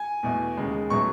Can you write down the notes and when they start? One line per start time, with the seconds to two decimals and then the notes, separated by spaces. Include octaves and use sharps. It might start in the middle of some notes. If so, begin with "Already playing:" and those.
Already playing: G#5
0.23 E2 B2 A3
0.57 D#2 C#3 G#3
0.90 B2 F#3 A3 C#6